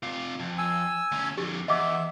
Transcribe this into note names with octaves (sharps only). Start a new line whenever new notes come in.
C3 F4
F2
G#5 E6
D2 C#4
F2 D3 G4
E2 D#5 E5 F#5 D6